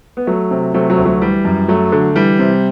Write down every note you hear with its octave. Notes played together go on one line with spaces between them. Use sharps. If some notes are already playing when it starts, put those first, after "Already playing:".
B3
F#3 A3
C3
C3 F#3 A3
F#3 A3
D2
F#3 A3
E3 G3
F#2
F#3 A3
D3
E3 G3
C3